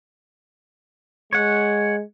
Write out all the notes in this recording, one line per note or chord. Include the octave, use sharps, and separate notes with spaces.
G#3 C#5 F#5